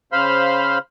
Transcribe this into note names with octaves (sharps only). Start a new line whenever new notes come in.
C#3 C5 F5 B5 C6 F6